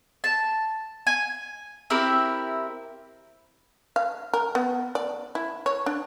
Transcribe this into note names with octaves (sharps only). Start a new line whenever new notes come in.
A5
G#5
C4 E4 G4 A#4
F5
A#4
B3
D5
E4
C#5
D4